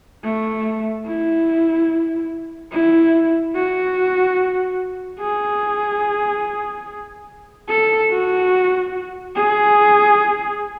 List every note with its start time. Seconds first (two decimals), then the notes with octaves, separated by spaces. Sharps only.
0.25 A3
1.07 E4
2.72 E4
3.56 F#4
5.21 G#4
7.69 A4
8.11 F#4
9.36 G#4